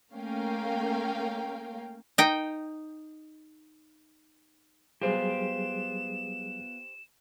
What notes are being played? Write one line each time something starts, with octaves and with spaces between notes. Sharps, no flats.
A3 A#3 C#4 A#4 F5 G5
D#4 G5
F#3 G3 B3 F4 G4 G#4 C5 E7